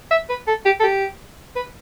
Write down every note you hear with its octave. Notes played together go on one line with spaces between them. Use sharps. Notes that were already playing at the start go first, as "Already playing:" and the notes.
E5
B4
A4
G4
A4
G4
B4